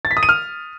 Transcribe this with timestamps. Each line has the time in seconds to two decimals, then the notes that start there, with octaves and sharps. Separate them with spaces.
0.05 A6
0.11 B6
0.17 D#6
0.23 D#7
0.29 F6